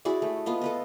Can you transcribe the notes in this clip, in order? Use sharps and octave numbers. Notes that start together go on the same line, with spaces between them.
E4 F#4 G#4 D5
A3
B3 F4 D#5
A4 B4 D#5